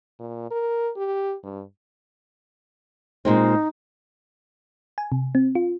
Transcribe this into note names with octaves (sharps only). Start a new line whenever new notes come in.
A#2
A#4
G4
G2
A#2 G#3 C4 D#4
G#5
C3
C4
F4